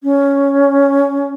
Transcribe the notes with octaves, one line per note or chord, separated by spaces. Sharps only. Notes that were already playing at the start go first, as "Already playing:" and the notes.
C#4